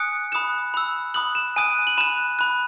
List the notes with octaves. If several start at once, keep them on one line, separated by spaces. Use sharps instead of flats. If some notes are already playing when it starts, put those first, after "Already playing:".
Already playing: G#5 D#6 F#6 C#7
B5 D#6 F#6 E7
B5 E6
B5 D#6 F#6 F#7
E7
G#5 D#6 F#6 D#7
F#7
B5 F#6 E7
B5 F#6